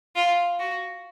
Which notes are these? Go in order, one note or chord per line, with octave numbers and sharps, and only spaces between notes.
F4
F#4